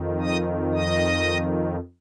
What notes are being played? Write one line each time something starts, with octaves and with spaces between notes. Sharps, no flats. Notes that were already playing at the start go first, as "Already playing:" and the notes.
Already playing: F2 D#3
D#5 D#6
D#5 D#6